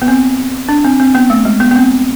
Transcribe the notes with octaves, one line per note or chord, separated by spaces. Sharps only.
B3
C4
D4
C4
C4
B3
A3
G#3
B3
B3
C4